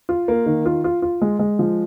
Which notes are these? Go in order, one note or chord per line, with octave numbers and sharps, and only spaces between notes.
F4
A#3
D#3
F4
F4
F4
G#3
G#3
F3